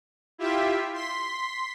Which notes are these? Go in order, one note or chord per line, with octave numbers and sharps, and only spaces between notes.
E4 F4 G4 E5
C6 B6